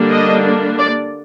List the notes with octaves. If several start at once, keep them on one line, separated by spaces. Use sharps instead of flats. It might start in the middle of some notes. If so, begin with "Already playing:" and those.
Already playing: D3 G3 A#3 D4
D#5
D5